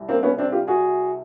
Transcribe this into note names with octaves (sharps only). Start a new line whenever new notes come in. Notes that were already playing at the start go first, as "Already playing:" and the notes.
Already playing: C2 C3 G3
A#3 C4
B3 C#4
C4 D4
F4 G4
F#4 G#4